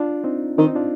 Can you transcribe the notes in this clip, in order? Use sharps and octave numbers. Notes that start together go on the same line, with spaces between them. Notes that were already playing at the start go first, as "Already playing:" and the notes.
Already playing: D4 F4
C4 D#4
D#3 C4 D#4
D4 F4